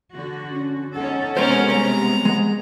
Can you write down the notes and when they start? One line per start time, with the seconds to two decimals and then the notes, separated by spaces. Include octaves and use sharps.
0.15 D3 F#4
0.51 C#4
0.95 C#4 D#4 A4 F#5
1.37 C3 G#3 B3 C#4 A#4 C5
1.72 G3 A#5
2.25 G#3 F#5